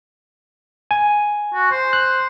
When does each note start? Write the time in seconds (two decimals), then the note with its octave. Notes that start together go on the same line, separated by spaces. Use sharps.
0.91 G#5
1.54 F#4
1.71 C5
1.93 F#6